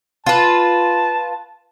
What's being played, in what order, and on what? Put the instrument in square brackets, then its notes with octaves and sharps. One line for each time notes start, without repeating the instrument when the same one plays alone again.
[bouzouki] F4 B4 [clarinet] A5